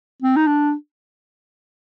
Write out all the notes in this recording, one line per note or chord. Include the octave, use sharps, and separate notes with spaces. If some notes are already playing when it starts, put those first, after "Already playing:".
C4
D#4
D4